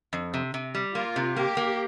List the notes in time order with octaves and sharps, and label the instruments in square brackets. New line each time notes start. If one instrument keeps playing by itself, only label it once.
[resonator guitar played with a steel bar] F2
C3
C3
G3
[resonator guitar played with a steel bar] A#3 [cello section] F4
[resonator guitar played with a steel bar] C3
[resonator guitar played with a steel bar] A#3 [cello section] G4
[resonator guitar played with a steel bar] A#3